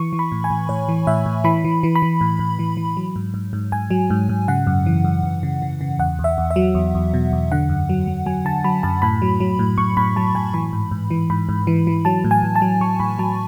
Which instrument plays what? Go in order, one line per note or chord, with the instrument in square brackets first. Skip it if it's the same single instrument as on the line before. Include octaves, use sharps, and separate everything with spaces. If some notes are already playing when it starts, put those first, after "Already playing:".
Already playing: [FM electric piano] E3 C#6
E3
B5
A2
G#5
A2
A2 C#5
E3
A2 E5
A2
E3 B5
E3
E3
B5
E3
A2
A2
E3
E3
F#3
G#2
G#2
G#2
G#2 G#5
F#3
G#2
G#2
C#3 F#5
F#2
E3
F#2
F#2
C#3
C#3
C#3
E2 F#5
E2
E5
E2
E5
F#3
E2
E2
B2
E2
D3 F#5
F#2
F#3
F#3
F#3 G#5
D3 A5
F#3 B5
F#2 A5
A2 B5
F#3
F#3
A2
A2 C#6
A2 B5
F#3 A5
A2 G#5
E3 B5
G#2
G#2
E3
G#2 B5
G#2
E3
E3
F#3 A5
A2
G#5
A2
A5
F#3
F#3 C#6
A2 B5
F#3 A5